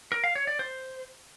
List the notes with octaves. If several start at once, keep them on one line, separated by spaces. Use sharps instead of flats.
A#4
F5
C#5
D5
C5